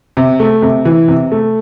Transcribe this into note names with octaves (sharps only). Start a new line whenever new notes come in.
C3
A3
C3
E3
C3
A3